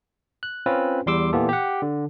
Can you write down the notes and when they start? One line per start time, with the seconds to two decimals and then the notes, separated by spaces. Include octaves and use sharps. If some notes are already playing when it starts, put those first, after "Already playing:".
0.43 F#6
0.66 C4 C#4 F4 B4
1.06 E2 G3 C6 D6 E6
1.33 A#2 E3 B3 F4 G4 A4
1.49 G4 F#5
1.82 D3